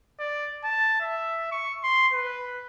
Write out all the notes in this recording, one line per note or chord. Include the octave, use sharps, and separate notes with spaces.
D5
A5
E5
C#6
C6
B4